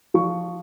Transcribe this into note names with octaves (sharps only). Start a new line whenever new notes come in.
F3 C#6